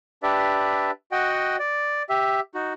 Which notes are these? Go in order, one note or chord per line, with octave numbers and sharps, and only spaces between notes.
D4 G4 B4 D5 E5
F#4 D#5 F#5 G5
D5
G4 E5
D#4 F#4